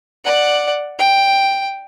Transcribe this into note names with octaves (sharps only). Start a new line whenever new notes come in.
D5 F#5
G5